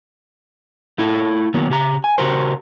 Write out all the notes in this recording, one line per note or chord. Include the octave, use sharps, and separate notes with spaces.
A3 E4 F4 A4
D#3 F#3 A#3 B3
C#3 G4 A#5
G#5
C#3 F#4 G4 A#4 C5